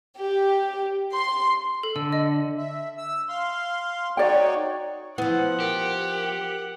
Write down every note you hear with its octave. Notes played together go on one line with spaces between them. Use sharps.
G4
C6
A4
D3 E6
D#5
E5
E6
F5 C6
D#4 F#4 C#5 D5 G5
F3 B3 E4 F#5
G4 A#4